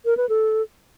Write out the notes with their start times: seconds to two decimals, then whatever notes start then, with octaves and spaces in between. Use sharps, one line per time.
0.05 A#4
0.17 B4
0.29 A4